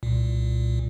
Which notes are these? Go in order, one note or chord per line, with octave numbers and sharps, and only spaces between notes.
C2 A#2